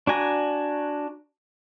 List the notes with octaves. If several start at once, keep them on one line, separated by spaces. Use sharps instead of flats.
D4 F#4 G#5 A#5